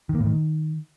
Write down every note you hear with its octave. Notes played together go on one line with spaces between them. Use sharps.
D#3
A#3
A2
D#3